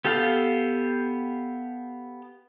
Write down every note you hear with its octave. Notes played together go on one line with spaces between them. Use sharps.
B3 G4 A4 F5